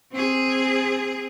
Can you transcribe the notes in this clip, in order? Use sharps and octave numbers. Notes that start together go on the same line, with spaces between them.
C4 G#4